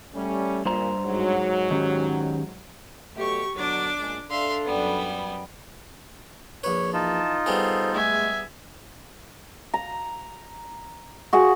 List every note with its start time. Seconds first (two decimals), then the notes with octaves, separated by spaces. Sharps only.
0.15 G3 A3 C#4
0.65 G2 A#2 C5 A#5
1.06 G#2 F#3
1.71 D#3 C#4 G4
3.16 B2 F#3 A3 G4 C#6
3.55 B2 D3 F#3 D4 D6
3.98 A#2 C#3 G#3
4.30 D4 A4 E5 F5 C6
4.65 F#2 G3 B3
6.64 A#1 B4 C#5
6.94 E3 D#4 F4 A5
7.46 G3 B3 G#4 A4 C5
7.94 G#3 A3 E5 G#5
9.74 A#5
11.33 F#4 G#4 F#5